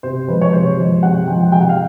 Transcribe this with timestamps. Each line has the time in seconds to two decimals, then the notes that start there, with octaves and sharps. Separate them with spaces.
0.03 C3 C5
0.28 F3 G#3 B4
0.41 C#5
0.53 C3 C5
0.78 F3 G#3
1.03 C3 F#5
1.28 F3 G#3 G5
1.52 C3 G5
1.61 F#5
1.69 F5